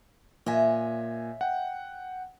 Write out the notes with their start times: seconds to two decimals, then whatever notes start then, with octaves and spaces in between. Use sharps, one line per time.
0.46 A#2 C#5 D#5 E5 G#5
1.41 F#5 G5